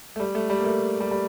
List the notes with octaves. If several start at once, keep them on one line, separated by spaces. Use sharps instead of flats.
A3
G3
A3
G3
A#3
A3
G3
G3